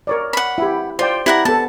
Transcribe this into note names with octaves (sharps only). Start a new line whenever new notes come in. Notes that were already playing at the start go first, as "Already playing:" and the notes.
A#4 C#5 D5
F#5 B5
E4 G4
F4 C5 D5 G5
E4 G4 F#5 A#5
B3 A4 A5